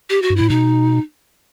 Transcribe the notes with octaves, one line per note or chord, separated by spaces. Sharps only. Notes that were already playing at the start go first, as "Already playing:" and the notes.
G4
F#4
G2
A2 E4
B2 D#4